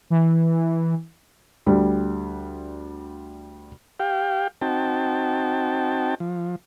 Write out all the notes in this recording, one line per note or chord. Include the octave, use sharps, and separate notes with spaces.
E3
D2 G3
G4 F5 G5
C4 D#4 F#4 G5 A5
F3